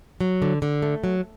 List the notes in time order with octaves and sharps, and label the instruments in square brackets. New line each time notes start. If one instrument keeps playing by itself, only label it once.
[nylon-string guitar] F#3
D3
D3
A3
F#3